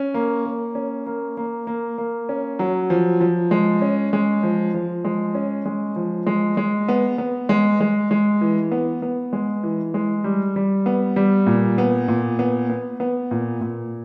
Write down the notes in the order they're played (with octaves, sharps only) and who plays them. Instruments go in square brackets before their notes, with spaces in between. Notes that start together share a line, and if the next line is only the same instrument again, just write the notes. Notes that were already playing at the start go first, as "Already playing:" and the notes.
Already playing: [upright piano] C#4
A#3
A#3
C#4
A#3
A#3
A#3
A#3
C#4
F#3
F3
F3
G#3
C#4
G#3
F3
F3
G#3
C#4
G#3
F3
G#3
G#3
B3
B3
G#3
G#3
G#3
E3
B3
B3
G#3
E3
G#3
G3
G3
B3
G3
A#2
B3
A#2
B3
B3
B3
A#2
A#2